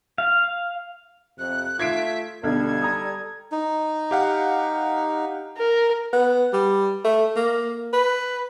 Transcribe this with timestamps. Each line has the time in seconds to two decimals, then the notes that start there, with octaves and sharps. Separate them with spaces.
0.18 F5
1.38 F2 C3 F#6
1.79 A3 F4 E5 G#6 C7 D7
2.43 B1 D3 G3 A4 G#6
2.82 A#5 D#6
3.52 D#4
4.11 G4 F5 F#5
5.58 A#4
6.13 B3
6.53 G3
7.05 A3
7.36 A#3
7.93 B4